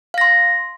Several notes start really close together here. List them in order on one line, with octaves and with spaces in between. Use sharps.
F5 A#6 C6